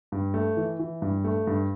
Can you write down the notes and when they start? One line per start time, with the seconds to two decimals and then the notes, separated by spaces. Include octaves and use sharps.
0.12 G2
0.34 A3
0.57 E3
0.80 E3
1.02 G2
1.24 A3
1.47 G2